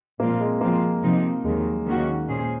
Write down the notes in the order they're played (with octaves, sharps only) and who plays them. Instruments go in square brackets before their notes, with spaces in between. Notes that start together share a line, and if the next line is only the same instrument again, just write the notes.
[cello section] A#2 F3 G#3 C4 F4 [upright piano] A#3
[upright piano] G#3
[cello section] F3 C4 F4 [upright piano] A#3
[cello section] C3 F3 C4 D#4
[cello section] D#2 D#3 F#3 [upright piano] G#3
[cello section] D#2 D#3 A#3 C#4 F#4
A#2 G#3 C#4 G#4 C5